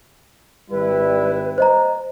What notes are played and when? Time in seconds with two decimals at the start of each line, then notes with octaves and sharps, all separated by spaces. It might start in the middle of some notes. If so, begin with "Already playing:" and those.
0.71 G#1 G3 E4 B4
1.58 C5 D#5 A#5